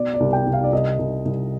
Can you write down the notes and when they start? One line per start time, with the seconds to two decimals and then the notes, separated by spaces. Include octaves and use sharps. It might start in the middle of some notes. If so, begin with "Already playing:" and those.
Already playing: B2 D5
0.14 D5
0.20 C2
0.33 G5
0.46 C2
0.53 F5
0.64 D5
0.72 C2 D#5
0.99 C2
1.25 C2